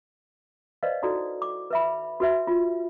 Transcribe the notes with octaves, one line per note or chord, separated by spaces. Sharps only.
B4 C5 D5 D#5 F5
D#4 E4 F#4 A4 D5
D6
B4 E5 B5
F#4 B4 E5
F4